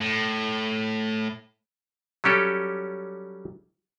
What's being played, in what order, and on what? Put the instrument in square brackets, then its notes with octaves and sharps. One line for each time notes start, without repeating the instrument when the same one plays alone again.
[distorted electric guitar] A2
[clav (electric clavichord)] F#3 G3 C#4 G4 A4